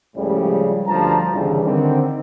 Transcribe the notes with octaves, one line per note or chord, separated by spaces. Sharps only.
C#2 A2 C#3 F3 G3
D2 G2 F3 A5 A#5
G1 C2 G2 C#3 E3 G3
D3 D#3 C4